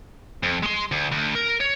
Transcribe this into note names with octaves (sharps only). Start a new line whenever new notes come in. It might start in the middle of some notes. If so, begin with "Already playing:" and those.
F2
G#3 C6
D2
D2
A#4
C#5